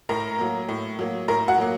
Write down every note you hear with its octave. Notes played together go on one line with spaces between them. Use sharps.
A2 A#4 A#5
F#3 A#3
A2
F#3 A#3
A2 A#4 A#5
F#4 F#5
F#3 A#3